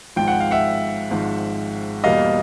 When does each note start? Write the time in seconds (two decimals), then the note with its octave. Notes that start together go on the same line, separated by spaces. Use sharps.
0.16 G#1 G#2 F3 G5
0.28 F#5
0.40 F5
0.51 E5 F#5
1.11 G#1 G#2 F3
2.04 E2 B2 G3 A#3 D#5 F5